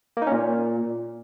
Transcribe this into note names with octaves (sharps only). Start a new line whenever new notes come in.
A#3
D#4
C#4
A#2